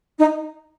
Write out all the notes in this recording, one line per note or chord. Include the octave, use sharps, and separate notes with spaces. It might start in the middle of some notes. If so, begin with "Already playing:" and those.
D#4